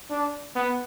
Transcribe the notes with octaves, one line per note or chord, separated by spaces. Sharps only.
D4
B3